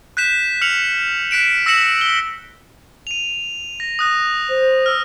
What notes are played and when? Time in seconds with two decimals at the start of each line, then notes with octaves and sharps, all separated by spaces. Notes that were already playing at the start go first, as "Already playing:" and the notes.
0.17 F#6 G6 B6 E7
0.61 F6 C#7 F7 F#7
1.31 F#6 B6 D7 E7
1.66 E6 A#6 B6 C#7 E7 F#7
2.01 G7
3.07 D#7 F7
3.80 A#6
3.99 D#6 F#6 A#6
4.49 C5
4.86 E6 F6